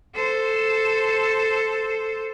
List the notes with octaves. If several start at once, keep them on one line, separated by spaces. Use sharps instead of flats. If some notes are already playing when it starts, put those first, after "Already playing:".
A4 C5